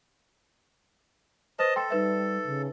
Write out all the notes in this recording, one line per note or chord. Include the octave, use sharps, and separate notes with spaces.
B4 C5 D#5 A5
A4 G5 C6
G3 D#4 B4 E5
C#3